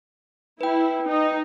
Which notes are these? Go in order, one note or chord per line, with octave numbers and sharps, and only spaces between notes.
E4 B4 G5
D#4